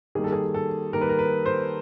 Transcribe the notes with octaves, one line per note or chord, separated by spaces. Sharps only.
D#3 G3 A#3 G#4
A4
G#4
A4
D#3 G3 A#3 A#4
B4
A#4
B4
C5